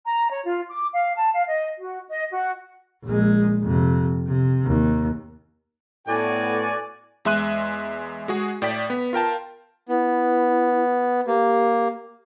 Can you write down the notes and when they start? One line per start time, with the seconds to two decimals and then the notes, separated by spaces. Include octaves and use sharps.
0.06 A#5
0.32 C#5
0.45 F4
0.69 D6
0.93 F5
1.16 A5
1.35 F5
1.47 D#5
1.79 F#4
2.09 D#5
2.32 F#4
3.04 A#1 G#3
3.63 F2 C3
4.27 C3
4.65 D#2
6.08 A2 B3 F#4 A4 D5 G#5
7.25 E2 G#3 E5 C6 F#6 D#7
8.28 G#3 F#4 G#4
8.62 A2 D5 G5 B6
8.90 B3
9.13 F4 A#4 G5 A5
9.89 B3 E4
11.27 A#3 G4